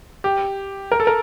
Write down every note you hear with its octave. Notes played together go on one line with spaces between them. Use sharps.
G4
A#4
A4
A#4